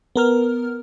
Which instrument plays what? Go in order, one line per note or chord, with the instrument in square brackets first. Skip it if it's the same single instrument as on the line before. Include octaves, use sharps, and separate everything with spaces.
[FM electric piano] B3 A#4 F6